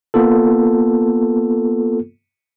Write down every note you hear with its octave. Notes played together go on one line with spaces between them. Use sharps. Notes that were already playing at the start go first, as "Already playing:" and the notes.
A#3 B3 F4 A4